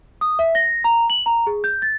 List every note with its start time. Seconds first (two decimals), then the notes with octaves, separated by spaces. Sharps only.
0.21 D#6
0.39 E5
0.55 A#6
0.84 A#5
1.10 F#7
1.26 A#5
1.47 G#4
1.64 G6
1.82 A6